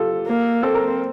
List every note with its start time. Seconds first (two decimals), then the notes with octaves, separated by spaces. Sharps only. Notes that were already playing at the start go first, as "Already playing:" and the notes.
Already playing: F4 G4 A4
0.27 A#3
0.63 C4 A4
0.75 A#4
0.87 C5